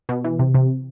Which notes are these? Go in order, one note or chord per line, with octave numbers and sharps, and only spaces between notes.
B2
E3
C3
C3